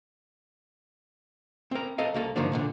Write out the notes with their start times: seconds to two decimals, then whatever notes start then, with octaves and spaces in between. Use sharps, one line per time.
1.71 C4 A#4
1.98 A4 A#4 D#5 F5
2.14 C2 A#3 F#4 A4
2.36 G2 D3 D#3 F3 A#3 D4
2.52 B1 A#2 D3